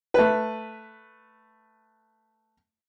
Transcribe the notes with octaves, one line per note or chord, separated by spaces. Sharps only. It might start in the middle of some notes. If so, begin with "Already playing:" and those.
A3 B4